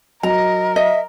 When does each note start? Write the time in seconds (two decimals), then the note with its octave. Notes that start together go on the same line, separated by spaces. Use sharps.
0.23 F#3 A#4 D#5 A#5
0.76 D#5 E5